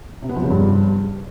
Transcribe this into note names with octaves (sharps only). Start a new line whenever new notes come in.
C3
B3
F3
C#3
G2